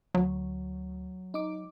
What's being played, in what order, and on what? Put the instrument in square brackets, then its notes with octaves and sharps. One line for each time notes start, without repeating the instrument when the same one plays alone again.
[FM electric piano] D2 [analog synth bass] F#3
[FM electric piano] D#4 D6